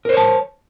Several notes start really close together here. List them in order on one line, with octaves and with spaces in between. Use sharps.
A#4 C5 C#5 A5